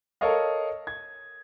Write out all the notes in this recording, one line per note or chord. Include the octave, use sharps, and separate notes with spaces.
A4 A#4 C#5 D#5 F5
G#6